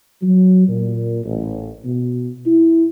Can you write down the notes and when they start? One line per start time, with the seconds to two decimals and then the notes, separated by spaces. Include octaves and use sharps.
0.22 F#3
0.68 A#2
1.24 A1
1.84 B2
2.46 E4